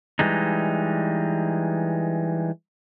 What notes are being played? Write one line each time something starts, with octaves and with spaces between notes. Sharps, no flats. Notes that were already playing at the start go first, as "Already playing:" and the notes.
E3 G3 G#3 D#4